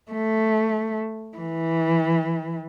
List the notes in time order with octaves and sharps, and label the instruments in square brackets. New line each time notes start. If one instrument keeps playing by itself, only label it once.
[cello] A3
E3